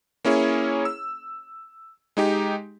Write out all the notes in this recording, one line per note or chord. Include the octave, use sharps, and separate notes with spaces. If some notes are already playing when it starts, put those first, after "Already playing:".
A#3 C#4 E4 G#4 C#5
E6
G#3 D#4 G4